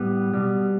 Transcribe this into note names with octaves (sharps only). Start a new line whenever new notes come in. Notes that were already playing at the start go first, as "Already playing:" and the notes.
Already playing: A2 G3 B3
B2 G3